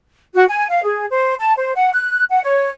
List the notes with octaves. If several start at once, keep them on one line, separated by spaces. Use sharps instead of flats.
F#4
G#5
F5
G#4
C5
A5
C5
F#5
F#6
F#5
C#5